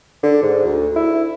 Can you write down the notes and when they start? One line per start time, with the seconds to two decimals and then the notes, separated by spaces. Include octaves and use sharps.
0.23 D3
0.43 G#2
0.65 D2
0.96 E4